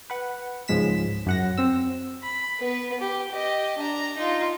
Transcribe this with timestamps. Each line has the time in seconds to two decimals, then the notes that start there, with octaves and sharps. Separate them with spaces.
0.10 B4 F#5
0.68 C#2 G#2 F3 G#3 B6 E7
1.27 F#2 F#5 A#6
1.58 C4 E6
2.23 B5
2.59 B3 B4
3.00 G4
3.31 G4 D#5
3.78 D4 A#5
4.17 D#4 F4